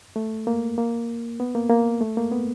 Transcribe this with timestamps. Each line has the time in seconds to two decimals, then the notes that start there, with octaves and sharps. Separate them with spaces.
0.16 A3
0.47 A#3
0.78 A#3
1.40 B3
1.55 A#3
1.70 A#3
2.01 A3
2.17 A#3
2.32 B3